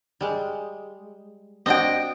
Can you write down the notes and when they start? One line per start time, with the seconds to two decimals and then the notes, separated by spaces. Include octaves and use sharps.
0.21 G3 G#3
1.66 C4 D4 F#4 D#5 G5